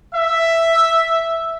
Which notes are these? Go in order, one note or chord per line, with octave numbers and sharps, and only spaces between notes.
E5